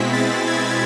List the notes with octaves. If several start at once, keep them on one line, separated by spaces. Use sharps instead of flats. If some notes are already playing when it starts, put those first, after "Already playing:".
Already playing: B2 G#3 C4 E4 B6
A6
G#6